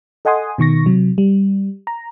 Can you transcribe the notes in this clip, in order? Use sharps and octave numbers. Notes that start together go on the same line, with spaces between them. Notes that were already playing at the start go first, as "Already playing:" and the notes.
A4 D#5 F#5 G#5 C6 D#6
B2 D#3 C#6 A#6
C3 F#3
G3
A#5